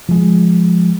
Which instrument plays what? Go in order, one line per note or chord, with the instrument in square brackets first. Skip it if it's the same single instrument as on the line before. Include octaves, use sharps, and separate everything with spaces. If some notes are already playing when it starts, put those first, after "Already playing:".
[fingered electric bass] F3 G#3